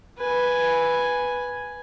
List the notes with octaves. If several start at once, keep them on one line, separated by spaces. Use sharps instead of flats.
B4 G#5